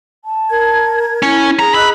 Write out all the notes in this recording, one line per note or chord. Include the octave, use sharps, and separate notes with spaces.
A5
A#4 G#6
C#4 E4
G#4 A#5
D#5 B5 E6 F#6